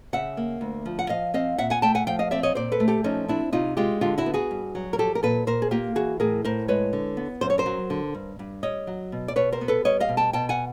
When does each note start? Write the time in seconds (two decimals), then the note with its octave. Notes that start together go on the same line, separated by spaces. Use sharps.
0.13 C#3 E5 F#5
0.37 A#3
0.61 D2
0.86 F3
0.99 F#5
1.09 F3 D#5 F5
1.34 C4 D#5 F5
1.58 A#2 E5 F#5
1.70 F#5 G#5
1.82 A3 G5 A5
1.95 F#5 G#5
2.07 F3 F5 G5
2.19 D#5 F5
2.31 C4 D5 E5
2.43 C#5 D#5
2.55 A#2 C5 D5
2.72 A4 B4
2.80 A3
2.88 G4 A4
3.04 F3 C#4 D#4
3.29 C4 D4 E4
3.53 C3 D#4 F4
3.77 G#3 F4 G4
4.01 D3 F4 G4
4.18 E4 F#4
4.26 B3
4.34 F#4 G#4
4.51 G2
4.75 F#3
4.93 A#4
4.98 F3 G4 A4
5.15 A#4
5.23 A#2 A4 B4
5.47 A#2 A#4 C5
5.62 G#4
5.71 A#3 F4 G4
5.95 E3 F#4 G#4
6.20 A2 G#4 A#4
6.45 A2 A#4 C5
6.68 G#3 B4 C#5
6.93 D3
7.17 B3
7.41 F#2 C5
7.50 C#5
7.58 A#4 C5
7.66 F#3
7.90 D3
8.15 G2
8.39 G2
8.63 G3 C#5 D#5
8.87 F#3
9.12 B2
9.28 D5
9.36 B2 B4 C#5
9.52 A#4 C5
9.61 B3
9.68 A4 B4
9.85 G3 C#5 D#5
10.00 D#5 F5
10.09 B2
10.17 G5 A5
10.33 B2 G5 A5
10.49 F#5 G#5